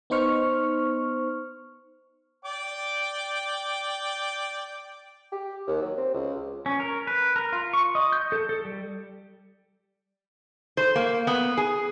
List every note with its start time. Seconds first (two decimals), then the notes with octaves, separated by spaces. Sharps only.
0.10 B3 D#4 C5 C#6 F6
2.45 D5 G5 D6
5.32 G4
5.68 D#2
5.82 F#3
5.97 C4
6.14 C#2
6.66 C#4
6.80 A#4
7.07 B4
7.36 A#4
7.53 F4
7.73 C#6
7.95 D#5
8.12 G6
8.32 A4
8.49 A4
8.65 G3
10.77 C5
10.96 A#3
11.27 B3
11.57 G#4